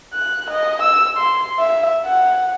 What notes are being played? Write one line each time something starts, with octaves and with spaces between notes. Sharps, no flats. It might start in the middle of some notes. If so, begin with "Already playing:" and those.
F#6
D#5
E6
C6
E5
F#5